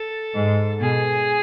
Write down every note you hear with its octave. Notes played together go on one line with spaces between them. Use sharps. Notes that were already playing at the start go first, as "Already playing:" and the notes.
Already playing: A4
G#2
B2 G#4